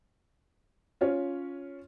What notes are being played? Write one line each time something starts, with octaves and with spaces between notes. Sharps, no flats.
C#4 F4 C#5